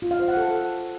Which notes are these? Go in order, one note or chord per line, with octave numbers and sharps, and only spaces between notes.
F4
F5
C5
F#5
A4